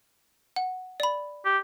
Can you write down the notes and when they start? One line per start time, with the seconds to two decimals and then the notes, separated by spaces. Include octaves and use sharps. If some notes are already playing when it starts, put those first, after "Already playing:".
0.56 F#5
1.00 D5 B5
1.45 G4